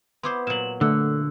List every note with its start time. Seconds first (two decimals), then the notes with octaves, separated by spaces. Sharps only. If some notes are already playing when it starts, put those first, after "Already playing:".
0.23 B3 E4 C5 C6 D6
0.47 A#2 F#3 E7 F#7
0.81 D3 A3 E6 F#6